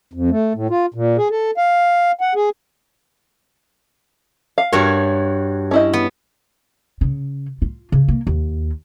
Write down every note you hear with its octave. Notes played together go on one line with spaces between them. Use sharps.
F2
A3
A2
F4
A#2
G#4
A4
F5
F#5
G#4
F5
G2 F#4 A#4 C#5
C#4 E4 D#5
B3
C#3
F4
C#3
A#3
D#2